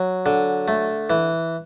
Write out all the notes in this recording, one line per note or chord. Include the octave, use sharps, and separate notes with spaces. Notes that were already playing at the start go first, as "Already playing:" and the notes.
Already playing: F#3
D3
A3
E3